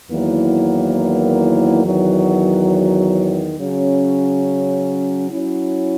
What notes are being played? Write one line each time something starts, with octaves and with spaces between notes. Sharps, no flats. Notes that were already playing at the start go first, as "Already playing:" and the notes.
E2 D#3 F#3 A#3 E4
E2 D#3 F#3
C#3 F#3 C#4
F#3 C#4 E4